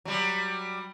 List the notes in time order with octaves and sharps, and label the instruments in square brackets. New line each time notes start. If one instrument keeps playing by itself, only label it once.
[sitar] F#3 G3